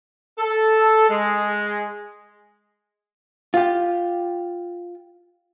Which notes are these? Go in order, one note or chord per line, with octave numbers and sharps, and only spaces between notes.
A4
G#3
F4 G4